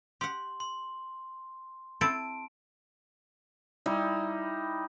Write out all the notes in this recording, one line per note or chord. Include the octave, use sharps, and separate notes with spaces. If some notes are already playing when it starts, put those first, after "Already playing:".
G4 F#5 C6
C6
C4 E4 A4 A5 D7
G3 D#4 E4